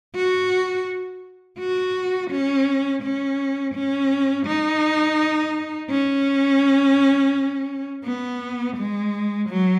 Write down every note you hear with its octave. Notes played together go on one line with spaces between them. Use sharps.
F#4
F#4
C#4
C#4
C#4
D#4
C#4
B3
G#3
F#3